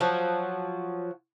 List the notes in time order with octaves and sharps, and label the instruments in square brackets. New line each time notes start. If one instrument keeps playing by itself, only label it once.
[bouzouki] F3 F#3 F#4